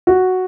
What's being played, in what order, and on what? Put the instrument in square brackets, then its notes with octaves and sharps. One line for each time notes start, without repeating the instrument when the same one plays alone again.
[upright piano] F#4